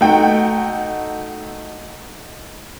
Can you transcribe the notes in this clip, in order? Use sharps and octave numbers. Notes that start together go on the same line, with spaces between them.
A3 D#4 F#4 F#5 G5